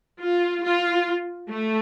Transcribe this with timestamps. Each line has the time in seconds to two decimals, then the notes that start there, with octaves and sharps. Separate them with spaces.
0.22 F4
0.64 F4
1.49 A3